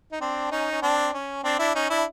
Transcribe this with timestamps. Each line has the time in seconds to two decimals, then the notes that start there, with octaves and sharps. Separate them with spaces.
0.12 D#4
0.21 C4 D4
0.52 C#4 D#4
0.72 C#4
0.82 C4 D4
1.14 C#4
1.44 C4 D4
1.59 D4 E4
1.75 C#4 D#4
1.90 D4 E4